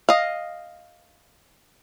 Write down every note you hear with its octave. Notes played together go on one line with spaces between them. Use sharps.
D#5 F5